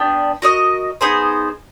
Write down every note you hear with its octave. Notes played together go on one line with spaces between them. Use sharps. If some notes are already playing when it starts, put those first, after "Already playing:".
Already playing: B3 D4 G4
F#4 A#4 D#5
B3 D#4 G#4 C5